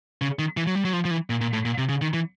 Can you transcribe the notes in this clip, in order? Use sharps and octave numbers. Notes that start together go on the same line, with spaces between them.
C#3
D#3
E3
F#3
G3
F#3
F3
F3
E3
A#2
A#2
A2
A#2
C3
C#3
D#3
E3